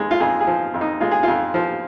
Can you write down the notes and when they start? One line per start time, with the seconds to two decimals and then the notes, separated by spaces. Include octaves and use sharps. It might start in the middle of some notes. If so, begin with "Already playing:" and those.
Already playing: F2 G#3
0.11 F4
0.20 F2 G#4
0.40 G#4
0.47 F3
0.74 F2
0.81 D#4
1.00 G#3 F4
1.11 G#4
1.23 F2 F4
1.54 F3